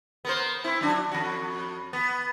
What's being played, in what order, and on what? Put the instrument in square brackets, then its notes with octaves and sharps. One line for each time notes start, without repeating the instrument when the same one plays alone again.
[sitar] B3 A#4 C5
C4 E4
F#3 D4 F#4
F2 F#4
B3